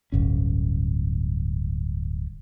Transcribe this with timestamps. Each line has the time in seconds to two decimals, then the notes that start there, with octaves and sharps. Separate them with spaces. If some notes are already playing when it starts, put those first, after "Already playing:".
0.12 D1 G1 C#4